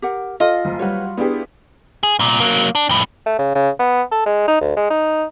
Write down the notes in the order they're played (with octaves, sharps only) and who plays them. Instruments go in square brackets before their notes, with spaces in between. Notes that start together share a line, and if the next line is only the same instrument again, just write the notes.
[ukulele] G4 A#4 F#5
[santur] F4 [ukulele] A4 [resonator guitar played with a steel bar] D#5
[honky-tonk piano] F#1
[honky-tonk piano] F#3 G3 F#4 [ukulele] B4 C#5
[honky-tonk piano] B3 D4 G4 [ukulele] E4 G#4
[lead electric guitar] G#4
C2 A#2
F#3 A#3
D4
F2 A2
[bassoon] A3
C#3
C#3
B3
A4
G#3
D#4
D2
G#3
D#4